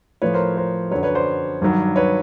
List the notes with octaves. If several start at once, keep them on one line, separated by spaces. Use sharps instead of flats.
A2 F3 B4 C#5
A#4 C5
A#4 C5
F#2 D3 F#3 B4 C#5
B4 C#5
C5 D5
G2 D#3 F#3
B4 C#5